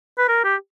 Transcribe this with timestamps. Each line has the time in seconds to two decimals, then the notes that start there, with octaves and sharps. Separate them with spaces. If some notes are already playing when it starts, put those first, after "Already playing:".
0.18 B4
0.28 A#4
0.44 G4